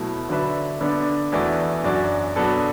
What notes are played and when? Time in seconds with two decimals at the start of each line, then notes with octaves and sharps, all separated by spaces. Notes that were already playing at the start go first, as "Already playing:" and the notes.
Already playing: B2 F#3 A3 E4
0.29 D3 F#3 D4 B4 E5
0.81 D3 B3 D4
1.32 E2 E3 A3 F#4 D5
1.84 F#2 F#3 D4 F#4 D5
2.36 B2 F#3 B3 D4 A4